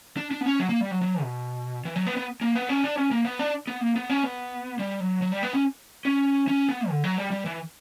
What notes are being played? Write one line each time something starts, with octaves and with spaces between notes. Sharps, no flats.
D4
D4
B3
C#4
F#3
A#3
G3
F#3
F#3
B2
E3
F#3
B3
B3
A#3
B3
C#4
D4
C#4
A#3
B3
D4
B3
A#3
B3
C#4
B3
G3
F#3
F#3
G3
B3
C#4
C#4
C#4
B3
D3
F#3
G3
G3
E3